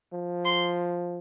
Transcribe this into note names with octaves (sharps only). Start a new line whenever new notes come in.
F3
C6